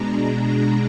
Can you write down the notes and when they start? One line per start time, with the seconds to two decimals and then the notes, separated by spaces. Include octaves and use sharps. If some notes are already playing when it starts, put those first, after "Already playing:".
Already playing: B2 G#3 D4 A#5
0.39 A#5